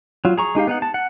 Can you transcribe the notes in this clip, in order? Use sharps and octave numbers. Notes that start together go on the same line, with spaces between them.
F#3 F4
G#4 A#5 C#6
G#3 D#4 G4 F5
B3 D#4 F#5
A5
F#5